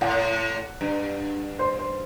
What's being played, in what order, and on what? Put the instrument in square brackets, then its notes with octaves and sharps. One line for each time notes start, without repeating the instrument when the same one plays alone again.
[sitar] A2 [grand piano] F#5
[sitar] G2
[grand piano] C5
C5